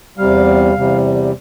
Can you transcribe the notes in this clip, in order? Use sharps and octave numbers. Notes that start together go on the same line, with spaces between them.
E2 C3 G3 F5
E2 C3 G3